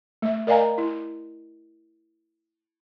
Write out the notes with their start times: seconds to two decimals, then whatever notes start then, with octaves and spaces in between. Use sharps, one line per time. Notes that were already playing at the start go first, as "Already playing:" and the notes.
0.22 A3 E5
0.47 A#4 D5 D#5 F5 G#5 A#5
0.78 E4